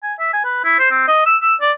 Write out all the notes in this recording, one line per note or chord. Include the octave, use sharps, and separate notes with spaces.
G#5
E5
G#5
B4
E4
C5
C4
D#5
E6
E6
D5